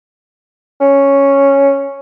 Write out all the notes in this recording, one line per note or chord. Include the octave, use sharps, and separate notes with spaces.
C#4